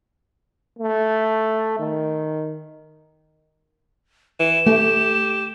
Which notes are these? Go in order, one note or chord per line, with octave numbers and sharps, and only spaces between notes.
A3
D#3
E3 E7
A3 G4